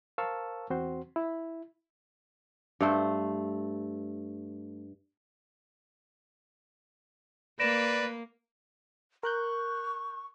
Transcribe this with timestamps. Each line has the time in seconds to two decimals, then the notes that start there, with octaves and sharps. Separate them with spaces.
0.18 A#4 C5 F5 A5 C#6 E6
0.70 E2 C4 F#4 C5 C6
1.16 E4
2.81 G2 A3 C5
7.60 A#3 B4 D5 A#6 D7 E7
9.23 A#4 C#6 F#6 G6